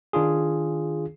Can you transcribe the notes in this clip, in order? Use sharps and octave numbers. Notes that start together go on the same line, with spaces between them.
D#3 D4 F4 G#4